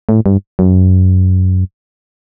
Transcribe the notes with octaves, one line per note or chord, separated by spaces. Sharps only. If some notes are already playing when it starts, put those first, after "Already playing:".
A2
G2
F#2